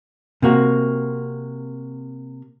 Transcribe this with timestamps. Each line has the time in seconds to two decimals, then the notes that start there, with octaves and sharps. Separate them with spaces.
0.42 C3 A#3 F#4